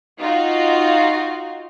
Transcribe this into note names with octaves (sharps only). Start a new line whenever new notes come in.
D#4 F4 F#4